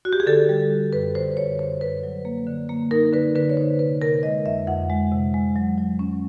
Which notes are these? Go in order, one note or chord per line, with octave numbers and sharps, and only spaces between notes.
F#4
G4
G#4
D3 A4
G3
D3
F#2 B4
D3 C5
F#2 C#5
F#2 C5
F#2 B4
F#3
A#3
D3
A#3
D#4 A#4
D3 B4
D3 B4
C#5
D#4 C5
C3 B4
C3 A#4
G#3 D#5
F2 E5
F2 F#5
G#3
C3
G#3
F#3
F#3
C#4